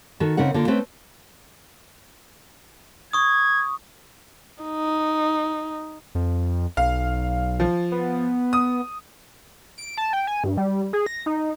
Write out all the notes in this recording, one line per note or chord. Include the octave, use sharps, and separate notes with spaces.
D#3 F#4 A4
C#3 C4 D#4 A#4 F#5
D3 A#3 F4
A3 C4 C#4 B4
C#6 D#6 G#6
D#4
F2
B1 F5
F3
B3
D#6
D7
A5
G5
G#5
G2
G3
G#4
A#6
D#4